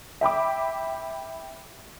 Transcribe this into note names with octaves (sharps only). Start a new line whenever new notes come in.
E5 G5 B5 D6